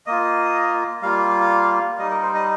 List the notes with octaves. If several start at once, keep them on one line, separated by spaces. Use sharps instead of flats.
A#3 F4 D#5
G3 A#3 F4 F5
G3 D#4 D#5
A#4
C5
D#5